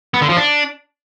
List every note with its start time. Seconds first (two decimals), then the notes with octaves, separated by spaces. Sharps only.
0.14 B3
0.22 D3
0.29 F3
0.37 D4